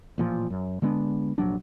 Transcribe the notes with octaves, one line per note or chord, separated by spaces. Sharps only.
A1 A#2 F3
F#2
D3 G#3 B3 D4
F1 A#1 F#3 D4